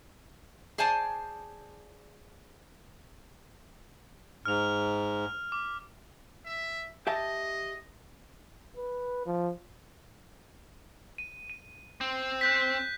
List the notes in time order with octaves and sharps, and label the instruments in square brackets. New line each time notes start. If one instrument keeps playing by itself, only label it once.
[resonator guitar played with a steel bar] G#4 C5 D5 G#5 A5
[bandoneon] G#2 [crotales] F6 F7
[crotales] D6
[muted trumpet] E5
[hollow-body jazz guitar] G4 E5 A5 [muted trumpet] D#5
[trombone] B4
F3
[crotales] D#7
D#7
[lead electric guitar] C4
[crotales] F#6 G6 B6